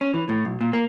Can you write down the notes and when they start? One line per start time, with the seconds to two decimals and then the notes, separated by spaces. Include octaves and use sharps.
0.01 C#4
0.14 E3
0.29 A2
0.45 B1
0.61 A#2
0.73 A#3